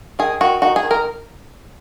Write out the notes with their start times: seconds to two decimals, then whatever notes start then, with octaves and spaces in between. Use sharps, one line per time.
0.19 D#3 G#4
0.41 D#3 F#4
0.62 D#4 F#4
0.76 G#4
0.83 D#3
0.91 A#4